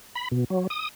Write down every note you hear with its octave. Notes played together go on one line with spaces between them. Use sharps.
B5
B2
F#3
D#6